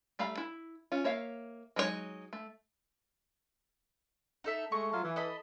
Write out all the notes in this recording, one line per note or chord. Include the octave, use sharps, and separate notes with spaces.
G3 A3 F5 A#5 B5
E4
C#4 F4
A#3 C#5 E5 F5
F#3 G#3 D#4 F4 C#5
A3
D#4 A4 E5
G#3 A3 C#6
F#3 A3 F4
E3
A4 D#5 B5